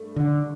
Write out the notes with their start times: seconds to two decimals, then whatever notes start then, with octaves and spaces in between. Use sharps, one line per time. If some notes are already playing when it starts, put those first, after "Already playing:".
Already playing: G2 A3
0.16 D3